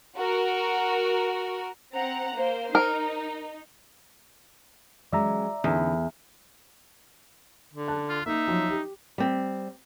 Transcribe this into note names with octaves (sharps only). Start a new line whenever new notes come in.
F#4 A#4
C4 F#5 A#5
A#3 C5
D#4 A#4
F#3 G#3 C#4 D5 E5 A#5
E2 D3 C#4 D#4
D3
A5 F#6
F4
A#3 D#4 E5
F3 F#3
G4
G3 C4